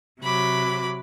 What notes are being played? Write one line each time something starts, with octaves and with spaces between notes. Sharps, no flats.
C3 F#3 B5 D6